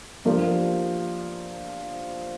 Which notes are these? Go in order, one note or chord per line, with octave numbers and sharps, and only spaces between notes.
F3 A#3 D4 G4 A#4